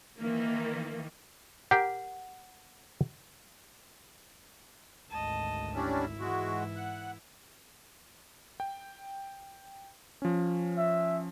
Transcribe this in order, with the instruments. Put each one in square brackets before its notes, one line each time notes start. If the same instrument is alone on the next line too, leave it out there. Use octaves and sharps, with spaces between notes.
[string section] D#3 E3 A#3
[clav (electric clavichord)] G4 A#4 G5 [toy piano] F#5
[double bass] G#1 D2 [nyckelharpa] D#5 A5
[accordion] G3 C#4 D4 [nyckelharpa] E4
[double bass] G#2 E3 [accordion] G#3 F#4
[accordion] F#5
[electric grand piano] G5
F3 C#4
[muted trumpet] E5